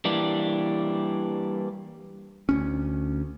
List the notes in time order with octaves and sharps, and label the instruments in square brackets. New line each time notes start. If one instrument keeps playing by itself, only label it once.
[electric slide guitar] E3 G3 A#3 D4
[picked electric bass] D2 C#4